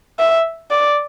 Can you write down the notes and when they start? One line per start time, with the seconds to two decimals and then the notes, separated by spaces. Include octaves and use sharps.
0.19 E5
0.70 D5